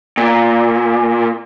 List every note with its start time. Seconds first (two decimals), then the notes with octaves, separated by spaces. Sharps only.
0.17 A#2